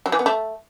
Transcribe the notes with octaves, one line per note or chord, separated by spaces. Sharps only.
F#3
E3
B3
A3